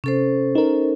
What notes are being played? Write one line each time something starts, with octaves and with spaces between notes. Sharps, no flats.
C3 C#4 A4 C5
D#4 A#4